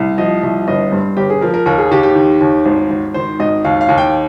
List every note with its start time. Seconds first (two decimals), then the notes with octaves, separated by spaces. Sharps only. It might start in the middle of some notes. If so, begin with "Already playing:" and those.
Already playing: C2
0.18 F3 D#5
0.43 C2
0.68 G1 D#5
0.92 G2 C5
1.17 G1 G4
1.30 G#4
1.41 F3 A#4
1.54 A#4
1.66 D#2 A#4
1.78 G#4
1.91 D#2 G4
2.03 G4
2.15 D#3
2.41 D#2
2.65 G#1 C5
2.90 G#1
3.14 D#3 C5
3.40 G#1 D#5
3.65 D#2 F5
3.81 F5
3.89 D#2
3.98 G5